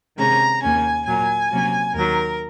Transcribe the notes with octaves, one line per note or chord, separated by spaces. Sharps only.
C3 D#3 G#3 C#4 A#5
D#2 D#3 A#3 C#4 G#5
A#2 F#3 A#3 G#5
C3 F#3 A#3 C#4
D#2 D#3 F#3 A#4